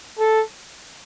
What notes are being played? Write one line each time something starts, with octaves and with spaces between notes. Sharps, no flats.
A4